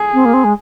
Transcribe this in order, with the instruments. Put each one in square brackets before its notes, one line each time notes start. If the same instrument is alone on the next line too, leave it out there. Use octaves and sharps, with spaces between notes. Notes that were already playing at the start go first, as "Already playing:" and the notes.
Already playing: [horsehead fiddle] G#4
[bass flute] C4
A#3
C4
G#3